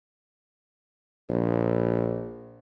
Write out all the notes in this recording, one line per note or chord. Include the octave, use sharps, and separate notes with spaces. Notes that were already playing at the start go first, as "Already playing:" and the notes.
A#1